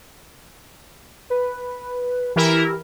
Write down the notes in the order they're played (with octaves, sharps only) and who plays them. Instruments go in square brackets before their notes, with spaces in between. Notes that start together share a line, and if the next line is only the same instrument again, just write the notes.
[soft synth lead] B4
[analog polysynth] E3 E4 A#4 [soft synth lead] G4